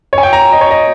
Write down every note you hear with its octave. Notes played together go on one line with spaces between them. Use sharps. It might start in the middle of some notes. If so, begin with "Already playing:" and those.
C#5
G#5
G5
A#5
D#5
C#5
D#5